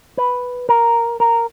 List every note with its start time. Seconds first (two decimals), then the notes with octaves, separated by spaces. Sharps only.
0.17 B4
0.69 A#4
1.20 A#4